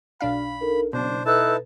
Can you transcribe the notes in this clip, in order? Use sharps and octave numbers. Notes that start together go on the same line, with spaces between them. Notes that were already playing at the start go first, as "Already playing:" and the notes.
B1 D4 F5 B5
D#4 A4 A#4
F#1 B2 D4 C5
D#4 E4 A4 B4 A5 E6 F#6